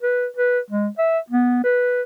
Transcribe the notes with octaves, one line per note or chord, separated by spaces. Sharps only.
B4
B4
G#3
E5
B3
B4